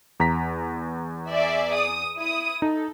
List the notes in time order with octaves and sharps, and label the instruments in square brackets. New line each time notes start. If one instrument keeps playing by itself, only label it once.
[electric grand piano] E2 A#5 B6
[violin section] G#4 D5 E5
D#6
E4 D#6
[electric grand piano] D#4 [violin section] A4